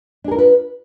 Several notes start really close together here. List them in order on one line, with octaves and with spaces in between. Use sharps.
D4 G#4 A#4 F4 B4